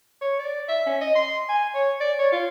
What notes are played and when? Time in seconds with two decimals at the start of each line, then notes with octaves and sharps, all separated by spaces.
0.21 C#5
0.39 D5
0.68 E5
0.86 C#4
1.01 D#5
1.15 C6
1.49 G#5
1.75 C#5
2.01 D5
2.19 C#5
2.32 F4